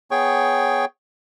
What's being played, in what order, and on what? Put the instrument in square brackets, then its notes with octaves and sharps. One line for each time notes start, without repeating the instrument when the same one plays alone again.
[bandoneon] B3 G#4 C#5 G5 C#6